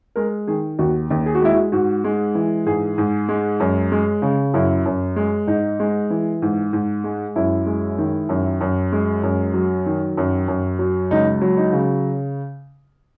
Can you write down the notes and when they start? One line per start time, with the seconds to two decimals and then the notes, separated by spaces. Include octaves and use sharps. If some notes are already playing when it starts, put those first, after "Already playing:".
0.16 G#3 A#4
0.47 D#3 G#4
0.79 D#2 F#4
1.11 D#2
1.26 G#4
1.35 F#4
1.42 G#3 E4
1.54 F#4
1.72 G#2 F#4
2.04 G#3
2.35 E3
2.66 G#2 G#4
2.98 G#2
3.29 G#3
3.60 F#2
3.92 G#3
4.22 C#3
4.54 F#2 E4
4.86 F#2
5.16 G#3
5.47 G#2 D#4
5.80 G#3
6.10 E3
6.42 G#2
6.73 G#2
7.04 G#3
7.36 F#2 E4
7.66 G#3
7.98 D#3
8.29 F#2
8.61 F#2
8.92 G#3
9.23 F#2
9.54 F#3
9.86 D#3
10.17 F#2
10.48 F#2
10.79 F#3
11.11 C#2 D#4
11.41 F#3
11.57 D#4
11.73 C#3